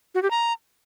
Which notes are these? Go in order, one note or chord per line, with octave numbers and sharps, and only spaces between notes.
F#4
G4
A#5